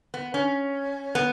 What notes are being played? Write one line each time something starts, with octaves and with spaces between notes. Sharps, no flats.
B3
C#4
B3